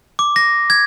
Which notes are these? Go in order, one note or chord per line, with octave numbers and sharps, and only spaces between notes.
D6
A#6
G#6